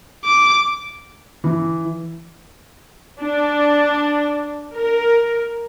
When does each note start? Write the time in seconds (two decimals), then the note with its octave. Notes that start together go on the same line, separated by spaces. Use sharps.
0.25 D6
1.44 E3
3.19 D4
4.75 A#4